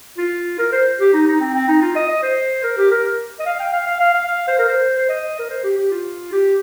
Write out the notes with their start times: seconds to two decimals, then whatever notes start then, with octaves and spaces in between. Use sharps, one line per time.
0.18 F4
0.59 A#4
0.73 C5
1.00 G4
1.13 D#4
1.27 D#4
1.41 C4
1.54 C4
1.68 D#4
1.81 F4
1.95 D#5
2.09 D#5
2.23 C5
2.63 A#4
2.77 G4
2.91 A#4
3.40 D#5
3.46 F5
3.59 G5
3.73 F5
3.86 F5
4.00 F5
4.14 F5
4.28 F5
4.48 C5
4.59 A#4
4.69 C5
4.98 C5
5.09 D#5
5.39 A#4
5.50 C5
5.64 G4
5.77 G4
5.91 F4
6.32 G4